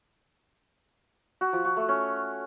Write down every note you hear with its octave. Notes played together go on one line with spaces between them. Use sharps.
F#4
F3
F#4
A3
C#4